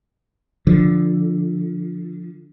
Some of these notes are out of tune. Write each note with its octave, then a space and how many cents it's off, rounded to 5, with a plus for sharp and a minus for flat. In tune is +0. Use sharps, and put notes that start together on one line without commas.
D3 +0 F3 +0